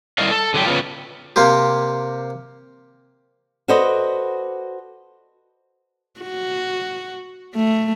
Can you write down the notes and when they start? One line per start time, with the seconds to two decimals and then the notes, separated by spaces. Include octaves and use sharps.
0.18 G3 E4 A#4 D5 D#5 F5
0.31 A4
0.54 D3 F#3 G4
0.66 C#3 B3 F4
1.36 C3 A#3 C4 G4
3.68 F#4 A4 B4 C5 D5 D#5
6.20 F#4
7.55 A3